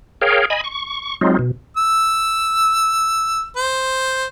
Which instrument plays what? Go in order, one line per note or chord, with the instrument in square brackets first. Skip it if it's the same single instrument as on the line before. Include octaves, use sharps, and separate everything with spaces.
[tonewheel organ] G#4 A#4 C#5 F5 G5
D#5 G#5 B5
C#6
F#3 G#3 C4 D#4 F4
B2
[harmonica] E6
C5